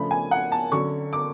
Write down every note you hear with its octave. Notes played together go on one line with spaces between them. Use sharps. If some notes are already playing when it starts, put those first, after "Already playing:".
Already playing: C#3 F3 A3 D4 B5
G#5
F#5
A5
D3 F#3 C#4 C#6
D6